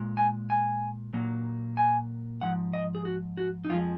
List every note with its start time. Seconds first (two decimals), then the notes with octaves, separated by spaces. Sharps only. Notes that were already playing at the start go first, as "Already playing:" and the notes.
Already playing: A#2 G#3
0.17 G#5
0.50 G#5
1.13 A#2 F#3 A#3
1.77 G#5
2.41 G#2 F3 F#5
2.73 D#5
2.95 G#4
3.05 F#4
3.37 F#4
3.65 D#4
3.69 F2 F3 G#3 F4